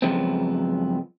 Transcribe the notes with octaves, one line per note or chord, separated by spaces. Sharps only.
F#2 C#3 F3 G#3 B3 C4